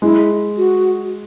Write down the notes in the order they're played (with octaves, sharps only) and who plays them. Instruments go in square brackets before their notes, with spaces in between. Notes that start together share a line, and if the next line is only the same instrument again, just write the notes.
[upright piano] G#3 [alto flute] E4
[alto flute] F#4